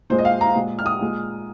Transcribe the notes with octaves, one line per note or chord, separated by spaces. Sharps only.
A#2 G#3 C5
D#5
F5
A#5
A#2 G#3
F6
D#6
A#2 G#3